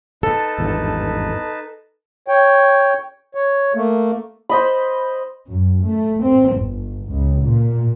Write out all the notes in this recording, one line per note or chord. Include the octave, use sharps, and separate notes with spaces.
D#4 A4 B4 A5
G#1 E2 G2
C#5 G5
C#5
A3 A#3
C5 D#5 B5
F#2
A3
C4
G1
C#2
A#2